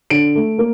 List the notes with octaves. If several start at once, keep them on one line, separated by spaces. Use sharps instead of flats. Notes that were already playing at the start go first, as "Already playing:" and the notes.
D3 D7
A3
A#3